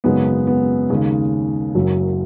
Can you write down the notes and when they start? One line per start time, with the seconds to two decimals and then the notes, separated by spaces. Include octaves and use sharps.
0.04 G#1 F#2 C#3 G#3 B3
0.47 B3
0.90 D#2 C#3 G#3
1.75 F#1 F#2 F#3